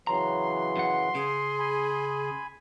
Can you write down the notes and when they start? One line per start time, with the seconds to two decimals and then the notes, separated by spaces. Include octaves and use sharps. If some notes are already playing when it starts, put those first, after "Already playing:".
0.07 C#3 E3 F#3 A#5 C6
0.76 F#2 F#5
1.15 C#3 G#4
1.59 G#5 B5